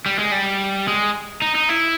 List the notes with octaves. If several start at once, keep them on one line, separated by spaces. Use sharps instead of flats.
G3
G#3
G3
G#3
D#4
D#4
E4